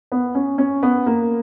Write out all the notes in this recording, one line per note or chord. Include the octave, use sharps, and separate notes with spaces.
B3
C#4
C#4
B3
A#3